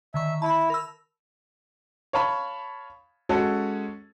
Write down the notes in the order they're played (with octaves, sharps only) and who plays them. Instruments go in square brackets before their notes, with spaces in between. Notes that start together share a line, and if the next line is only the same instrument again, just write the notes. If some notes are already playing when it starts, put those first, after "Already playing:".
[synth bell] D3 D#3 C#6 [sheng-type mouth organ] E5
[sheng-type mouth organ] E4 [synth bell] A5 B5
[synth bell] A#4 B5 E6
[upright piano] C#5 F5 A5 B5 C#6
G#3 C#4 F#4 A4